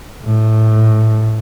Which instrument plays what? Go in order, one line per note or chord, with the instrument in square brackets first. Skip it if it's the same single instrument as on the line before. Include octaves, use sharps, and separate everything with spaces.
[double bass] A2